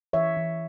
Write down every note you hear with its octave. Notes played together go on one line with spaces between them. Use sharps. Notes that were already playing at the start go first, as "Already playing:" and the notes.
E3 C#5 E5
E3